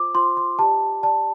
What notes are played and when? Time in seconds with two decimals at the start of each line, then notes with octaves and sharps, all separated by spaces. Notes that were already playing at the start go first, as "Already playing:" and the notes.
Already playing: F4 C5 D6
0.15 F4 C5 C6
0.37 C6
0.58 G4 D5 A5
1.03 G4 D5 A5